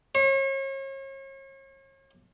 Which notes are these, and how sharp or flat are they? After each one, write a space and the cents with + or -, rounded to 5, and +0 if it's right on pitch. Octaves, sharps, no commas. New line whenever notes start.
C#5 -40